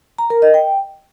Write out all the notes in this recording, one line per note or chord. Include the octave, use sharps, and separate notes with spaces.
A#5
A#4
D#5
G5